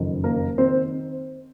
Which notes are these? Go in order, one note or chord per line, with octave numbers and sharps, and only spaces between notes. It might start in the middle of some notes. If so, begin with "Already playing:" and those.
Already playing: F#1 F2 D#3
A#3 A#4
D#3 C4 C5